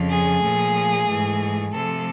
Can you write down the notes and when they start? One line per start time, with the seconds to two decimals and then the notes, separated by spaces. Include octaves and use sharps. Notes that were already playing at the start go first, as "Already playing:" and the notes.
Already playing: F2 C#3 F3
0.10 G#4
0.42 A#2 F3 A3
1.08 G#2 E3 A3
1.73 C3 F3 A3 A4